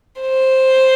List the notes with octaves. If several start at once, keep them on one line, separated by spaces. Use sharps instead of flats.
C5